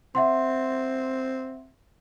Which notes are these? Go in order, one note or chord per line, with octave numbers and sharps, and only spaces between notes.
C4 E5 F#5 C6